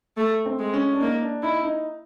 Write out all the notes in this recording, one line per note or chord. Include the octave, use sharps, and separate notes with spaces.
A3
C4
G#3
C#4
D4
A#3 D#4
D4
D#4 E4
D#4